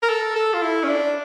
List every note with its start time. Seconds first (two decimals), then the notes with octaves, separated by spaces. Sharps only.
0.03 A#4
0.09 A4
0.36 A4
0.54 F4
0.62 E4
0.84 C#4
0.88 D4